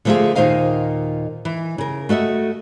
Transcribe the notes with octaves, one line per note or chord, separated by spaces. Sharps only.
D3 F3 A3 A#3 F4 G#4
D#2 A#2 D#3 C5 D#5 F5
E3
C#3 A#4
A3 F#4 D#5 E5